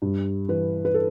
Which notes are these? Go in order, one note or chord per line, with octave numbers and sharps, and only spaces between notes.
G2
E3 B4
B4
A4